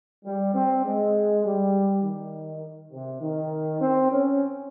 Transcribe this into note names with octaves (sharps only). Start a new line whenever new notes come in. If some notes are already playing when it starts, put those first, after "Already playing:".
G3
C4
G#3
G3
D#3
C3
D#3
C4
C#4